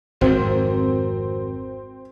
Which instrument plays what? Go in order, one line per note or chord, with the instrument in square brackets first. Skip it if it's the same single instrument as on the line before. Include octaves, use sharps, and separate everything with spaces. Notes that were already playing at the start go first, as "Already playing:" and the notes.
[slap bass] G#1 F2 G#2 [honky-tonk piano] C4 [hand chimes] F#4 A#4